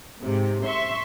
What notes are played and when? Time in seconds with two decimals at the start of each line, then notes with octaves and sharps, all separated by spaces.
0.22 G#2 C3
0.66 E5 C6 C#6